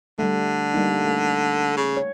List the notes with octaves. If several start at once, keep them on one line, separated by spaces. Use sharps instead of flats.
D3 G3 A3
G3 A#3 D#4
A3
C#3
C#5